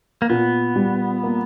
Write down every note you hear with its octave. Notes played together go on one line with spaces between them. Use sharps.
A#3
A#2 B3
G3
A#3